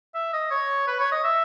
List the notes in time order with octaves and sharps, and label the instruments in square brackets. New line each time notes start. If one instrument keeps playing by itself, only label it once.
[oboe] E5
D#5
C#5
B4
C#5
D#5
E5